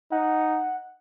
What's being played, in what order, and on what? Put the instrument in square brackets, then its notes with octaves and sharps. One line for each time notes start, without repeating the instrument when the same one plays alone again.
[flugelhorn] D#4 [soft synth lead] F#5